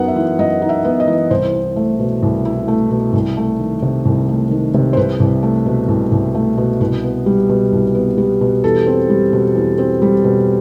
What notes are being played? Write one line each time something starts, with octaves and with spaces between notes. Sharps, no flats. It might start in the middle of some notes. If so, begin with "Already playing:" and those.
Already playing: F#2 B3 D#4 F#5
E5
E3
F#2 D#5
D#4
E5
B3
D#5
E3
C2 C5
E4
A3
B2
C2
E4
A3
B2
C2
A3
D#3
C3
C2
A3
D#3
C3
C5
C2 B4
C2
A3
B2
C2
C2
A3
B2
C2 B4
B3
G3
B2
C2
B3
G3
B2
E2 A4
C4
G3
B2
E2
C4
G3
B2